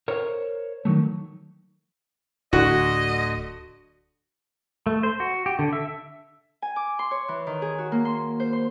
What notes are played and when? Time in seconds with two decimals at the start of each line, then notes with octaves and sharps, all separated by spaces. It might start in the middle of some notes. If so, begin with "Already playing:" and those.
0.08 A#4 C5 C#5
0.85 D#3 F#3 A3
2.53 D1 D2 D3 F#4 D#5
4.87 A3
5.03 C5
5.20 F#4
5.46 G4
5.59 D3
5.73 E5
6.62 G#5
6.76 D6
6.99 C6
7.11 C#5
7.28 E3
7.47 D#3
7.62 G#4
7.78 F#4
7.92 A#3
8.05 C6
8.40 C5
8.53 C6